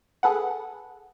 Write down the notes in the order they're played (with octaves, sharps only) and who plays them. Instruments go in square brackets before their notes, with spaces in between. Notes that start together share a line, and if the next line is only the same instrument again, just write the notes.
[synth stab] G#4 A4 B4 F#5